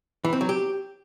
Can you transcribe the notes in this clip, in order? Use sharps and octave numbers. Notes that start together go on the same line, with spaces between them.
E3
C4
F#3
G4